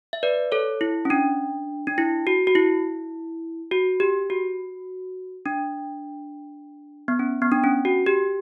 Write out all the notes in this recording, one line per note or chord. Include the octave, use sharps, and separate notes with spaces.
E5
B4 D5
A4 C#5
E4
C#4
D4
D4
E4
F#4
F#4
E4
F#4
G4
F#4
D4
B3
C#4
B3
D4
C#4
F#4
G4